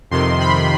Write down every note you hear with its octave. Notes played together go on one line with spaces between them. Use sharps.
F2 C3 D#3 C6
B5